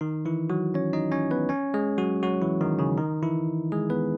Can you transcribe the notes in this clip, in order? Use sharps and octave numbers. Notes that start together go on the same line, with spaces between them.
D#3 D#4
E3 E4
F#3 F#4
C#4 C#5
D#4 D#5
C#4 C#5
B3 B4
C#4 C#5
G#3 G#4
F#3 F#4
F#3 F#4
E3 E4
D#3 D#4
C#3 C#4
D#3 D#4
E3 E4
G#3 G#4
B3 B4